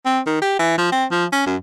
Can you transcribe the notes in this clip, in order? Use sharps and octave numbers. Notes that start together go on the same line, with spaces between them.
C4
D#3
G4
E3
F3
C4
F3
C#4
F#2